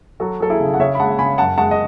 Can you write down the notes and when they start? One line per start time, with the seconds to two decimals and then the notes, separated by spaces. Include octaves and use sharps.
0.20 F#3 F#4 A4
0.40 F#3 A4
0.49 E4 G#4
0.60 C#3
0.74 F#5
0.79 C#3 C#5 E5
0.95 B5
0.99 G#3 F#5 A5
1.18 C#3 G#5 B5
1.38 F#2 F#5 A5
1.57 G#3 F#5 A5
1.71 D#5